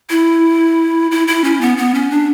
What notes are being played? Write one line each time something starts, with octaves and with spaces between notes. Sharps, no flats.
E4
E4
E4
C#4
B3
B3
C#4
D4